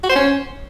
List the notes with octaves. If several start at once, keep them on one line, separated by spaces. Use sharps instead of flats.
F#4
C5
C#4